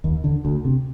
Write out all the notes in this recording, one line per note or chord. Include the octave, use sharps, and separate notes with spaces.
D#2
D3
D2
C3